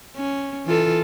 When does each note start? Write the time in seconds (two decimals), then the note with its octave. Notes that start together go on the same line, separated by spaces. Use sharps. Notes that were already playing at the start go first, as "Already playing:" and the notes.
0.17 C#4
0.66 E3 F4 A4